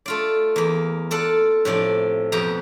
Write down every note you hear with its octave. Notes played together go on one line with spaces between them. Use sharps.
A3 F4 D5
E2 A#3
F4 A4 D5 F#5
A2 C3 F3 D5
F2 B2 G4 A#5